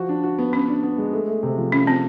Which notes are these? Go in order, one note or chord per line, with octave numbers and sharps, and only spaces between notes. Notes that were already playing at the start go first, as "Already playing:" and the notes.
Already playing: F3 F#4
D4
F#4
B3
B3 C#4
D4
B3
G#3
A3
A3
C3
F3
F3 C#4
F3 C4